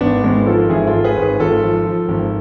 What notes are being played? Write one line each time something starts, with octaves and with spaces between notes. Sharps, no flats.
G#1 B3 D4
G#1 G#3 B3
F3 F4 A4
G#1 E4 G#4
F4 A4
G#1
G#4 B4
G#1
G#4 B4
G#1 F4 A4
F3
F3
G#1